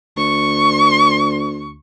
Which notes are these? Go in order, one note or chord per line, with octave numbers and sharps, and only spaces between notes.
D2 C#6